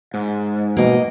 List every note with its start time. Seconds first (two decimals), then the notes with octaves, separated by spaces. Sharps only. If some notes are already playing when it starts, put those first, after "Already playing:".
0.14 G#2
0.77 B2 A#3 D#5